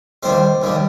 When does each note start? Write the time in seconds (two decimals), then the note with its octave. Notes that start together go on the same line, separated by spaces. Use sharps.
0.23 D#2 D#3 G3 C5
0.62 D#2 D#3 G3